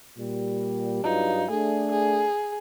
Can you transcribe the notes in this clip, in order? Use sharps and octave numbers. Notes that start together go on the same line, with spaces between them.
A#2 G3
G2 F#3 D#4 F4
A3 D4 G#4
G#4